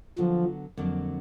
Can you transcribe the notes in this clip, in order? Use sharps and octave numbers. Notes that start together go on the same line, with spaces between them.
D3 F3 F#3 B3
F2 D3 F#3 A#3 D4